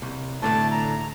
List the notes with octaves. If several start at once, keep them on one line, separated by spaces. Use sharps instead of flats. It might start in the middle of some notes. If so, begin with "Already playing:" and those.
C2
A2 D3 A3 A5
A#5